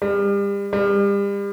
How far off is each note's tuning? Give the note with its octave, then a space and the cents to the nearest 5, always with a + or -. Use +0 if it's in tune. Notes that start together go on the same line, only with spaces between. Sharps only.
G3 +35
G3 +35